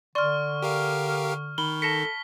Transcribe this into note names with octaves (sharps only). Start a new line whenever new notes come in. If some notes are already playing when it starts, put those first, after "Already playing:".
D3 D5 C6 C#6 F6
G4 A#4 F5
D#3 B5 G7
A4 A5 A#6 B6 C#7